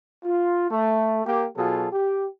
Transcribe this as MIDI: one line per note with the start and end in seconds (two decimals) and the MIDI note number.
0.25 0.70 65
0.70 1.22 57
1.26 1.45 58
1.26 1.45 67
1.57 1.87 47
1.57 1.87 54
1.57 1.87 65
1.57 1.87 68
1.57 1.87 69
1.93 2.27 67